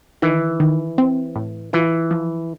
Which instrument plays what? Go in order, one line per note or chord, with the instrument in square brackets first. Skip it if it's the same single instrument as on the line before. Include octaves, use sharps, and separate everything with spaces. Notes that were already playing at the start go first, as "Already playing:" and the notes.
[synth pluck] D#3 [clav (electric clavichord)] E3
[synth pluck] D#3
C4
A2
[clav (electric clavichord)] E3 [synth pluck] F4
[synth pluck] F3